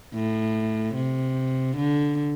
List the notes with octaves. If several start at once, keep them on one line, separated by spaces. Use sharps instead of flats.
A2
C3
D3